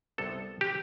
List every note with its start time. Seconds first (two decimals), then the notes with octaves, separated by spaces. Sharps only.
0.18 C2 C3 G3 B3 A4
0.61 G4